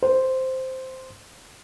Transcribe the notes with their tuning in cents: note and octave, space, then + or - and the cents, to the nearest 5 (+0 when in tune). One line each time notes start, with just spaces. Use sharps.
C5 -5